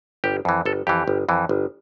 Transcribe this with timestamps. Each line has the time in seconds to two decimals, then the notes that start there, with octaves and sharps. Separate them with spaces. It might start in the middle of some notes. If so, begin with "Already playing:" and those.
0.24 G1 G4
0.45 F2 E3
0.66 G1 A4
0.87 F2 E3 G4
1.08 G1
1.29 F2 E3
1.49 G1